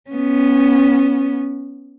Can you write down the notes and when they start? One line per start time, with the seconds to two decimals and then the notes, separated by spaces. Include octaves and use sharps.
0.10 B3 C#4